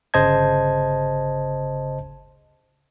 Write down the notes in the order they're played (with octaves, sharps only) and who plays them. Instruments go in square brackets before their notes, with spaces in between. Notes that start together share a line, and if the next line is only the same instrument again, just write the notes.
[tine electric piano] G1 C#3 C5 D#5 A5 G#6